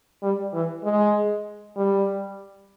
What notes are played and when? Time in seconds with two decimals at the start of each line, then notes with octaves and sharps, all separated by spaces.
0.23 G3
0.54 E3
0.84 G#3
1.77 G3